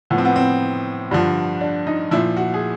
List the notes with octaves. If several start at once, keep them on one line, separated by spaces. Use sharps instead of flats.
A2 F3 B3
C4
B3
C4
G2 D3 F3
D4
D#4
A#2 F3 E4
F#4
G#4